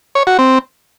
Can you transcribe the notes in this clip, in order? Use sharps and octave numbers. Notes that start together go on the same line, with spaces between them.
C#5
F#4
C4